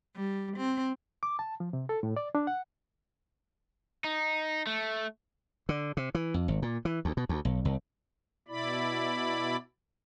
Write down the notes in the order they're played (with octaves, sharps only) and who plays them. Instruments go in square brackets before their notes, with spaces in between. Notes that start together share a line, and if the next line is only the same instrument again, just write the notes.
[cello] G3
C4
[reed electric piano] D6
A5
F3
C3
A4
A2
D5
D4
F#5
[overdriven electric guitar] D#4
A3
[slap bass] D3
C3
E3
F2
G#1
A#2
E3
D2
B2
D2
B1
C2
[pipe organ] B2 E4 D5 B5